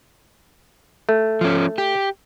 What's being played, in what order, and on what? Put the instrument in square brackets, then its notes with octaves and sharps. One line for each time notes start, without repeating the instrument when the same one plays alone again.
[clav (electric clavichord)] A3
[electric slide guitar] F3 C#4
G4